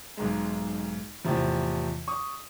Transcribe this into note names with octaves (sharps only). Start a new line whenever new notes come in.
B1 G#2 G#3
E2 A2 C3 F3
C#6 D#6